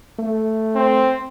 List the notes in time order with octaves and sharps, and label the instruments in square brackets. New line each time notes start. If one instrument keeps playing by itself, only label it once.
[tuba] A3
[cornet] C4